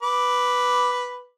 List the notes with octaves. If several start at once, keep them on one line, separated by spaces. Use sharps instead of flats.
B4 D6